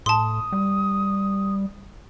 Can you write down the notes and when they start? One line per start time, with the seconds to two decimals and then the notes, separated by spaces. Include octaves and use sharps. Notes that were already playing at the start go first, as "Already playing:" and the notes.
0.06 A2 A5 C6 D#6
0.52 G3